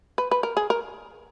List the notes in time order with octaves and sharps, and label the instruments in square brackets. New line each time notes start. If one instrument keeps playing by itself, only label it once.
[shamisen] B4
B4
A#4
G#4
A#4